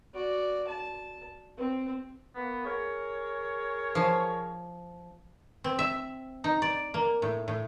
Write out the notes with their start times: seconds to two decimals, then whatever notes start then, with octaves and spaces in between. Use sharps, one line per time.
0.14 F#4 D5
0.67 A5
1.58 C4
2.34 A#3 B3
2.64 G#4 A#4 C#5
3.95 F3
5.64 C4
5.79 E5
6.44 D#4
6.62 D5
6.94 A#3
7.22 A2
7.48 A2